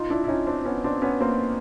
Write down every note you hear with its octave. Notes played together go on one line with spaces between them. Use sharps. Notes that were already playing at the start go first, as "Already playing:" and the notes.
Already playing: D#4 F4
D4 E4
E4
C#4 D#4
C4 D4
B3 C#4
C4 D4
B3 C#4
A#3 C4